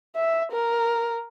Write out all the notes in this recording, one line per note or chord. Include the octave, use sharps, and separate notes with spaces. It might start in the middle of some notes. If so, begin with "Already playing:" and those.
E5
A#4